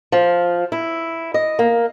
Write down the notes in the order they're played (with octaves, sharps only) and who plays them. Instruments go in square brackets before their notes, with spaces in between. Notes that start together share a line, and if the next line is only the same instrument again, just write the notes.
[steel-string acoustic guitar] F3
E4
D#5
A#3